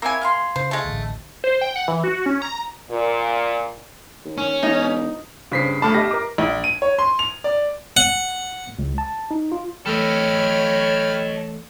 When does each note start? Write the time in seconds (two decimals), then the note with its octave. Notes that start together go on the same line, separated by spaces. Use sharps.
0.02 A#3 C4 E4 C#5 G#5
0.21 F5 A#5 C6
0.56 C#3 C5
0.71 G#3 A3
0.84 A1 D2
1.44 C5
1.61 G5
1.76 F#5
1.88 E3
2.04 F#4
2.26 C#4
2.42 A#5
2.91 A#2
4.25 D#2
4.38 C#4
4.63 E1 D#4
5.52 G2 C#3 C4 B6 C7
5.82 G1 A3 A5 B5 D6 F6
5.94 G4 D#5 E5 A#6
6.11 A#4 D6
6.38 A#1
6.64 D#7
6.82 C#5
6.99 C6
7.19 F7
7.44 D5
7.97 F#5
8.79 C#2
8.98 A5
9.31 D#4
9.52 F4
9.86 E2 A3 A4 C#5 D#5 G5 B5 F6